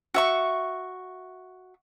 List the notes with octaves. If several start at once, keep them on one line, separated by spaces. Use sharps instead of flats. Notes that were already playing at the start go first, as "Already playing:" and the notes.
F#4 E5 C#6